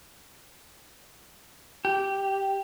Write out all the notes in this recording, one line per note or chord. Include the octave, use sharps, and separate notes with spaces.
G4